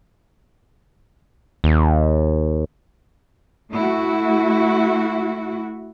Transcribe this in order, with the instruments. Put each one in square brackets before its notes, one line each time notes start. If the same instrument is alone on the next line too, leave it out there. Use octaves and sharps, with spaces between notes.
[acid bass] D#2
[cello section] A3 E4 F#4